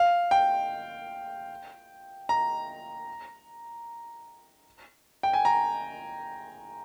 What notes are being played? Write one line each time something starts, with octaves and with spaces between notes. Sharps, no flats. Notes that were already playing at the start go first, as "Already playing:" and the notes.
Already playing: F5
G5
A#5
G5
G#5
A#5